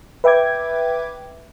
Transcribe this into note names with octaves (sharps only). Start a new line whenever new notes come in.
B4 E5 G5 D6 G#6